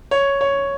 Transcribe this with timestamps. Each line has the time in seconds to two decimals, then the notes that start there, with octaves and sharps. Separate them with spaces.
0.11 C#5
0.41 C#5